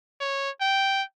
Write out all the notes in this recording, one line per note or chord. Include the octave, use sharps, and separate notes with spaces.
C#5
G5